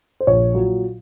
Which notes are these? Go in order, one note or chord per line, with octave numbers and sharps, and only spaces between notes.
C5
A#1 C#5
A#2 F#3